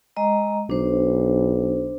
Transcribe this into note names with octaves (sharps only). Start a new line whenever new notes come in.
G#3 D#5 A#5
B1 D4 C5